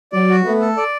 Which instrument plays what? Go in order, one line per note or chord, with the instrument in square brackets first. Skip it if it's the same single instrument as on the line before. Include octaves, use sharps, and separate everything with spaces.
[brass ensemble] F#3 [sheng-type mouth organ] D5
[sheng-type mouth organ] F#4
[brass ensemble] A3 [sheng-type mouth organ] B3
[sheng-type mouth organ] A4
D5